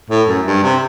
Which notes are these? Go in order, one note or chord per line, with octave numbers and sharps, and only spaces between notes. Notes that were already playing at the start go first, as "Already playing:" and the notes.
A2
F#2
G2
C3